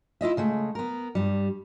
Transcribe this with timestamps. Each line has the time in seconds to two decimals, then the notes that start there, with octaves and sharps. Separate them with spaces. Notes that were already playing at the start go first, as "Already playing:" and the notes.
0.21 E4 F4 D#5 E5
0.37 C#3 G#3 A3
0.75 B3 A#4
1.15 G2 G3